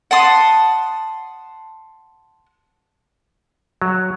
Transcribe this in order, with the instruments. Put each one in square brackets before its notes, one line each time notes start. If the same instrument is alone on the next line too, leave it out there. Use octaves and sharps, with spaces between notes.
[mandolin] F#5 A5 C6 D#6
[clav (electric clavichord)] F#3